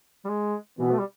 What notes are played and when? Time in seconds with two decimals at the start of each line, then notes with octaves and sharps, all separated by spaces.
0.25 G3
0.29 G#3
0.79 B2 E3 B3
0.91 A3
0.99 G3